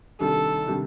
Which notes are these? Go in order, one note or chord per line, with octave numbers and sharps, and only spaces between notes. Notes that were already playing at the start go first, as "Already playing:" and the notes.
C3 D#3 G3 D4 A4
C3 D#3 G3 D4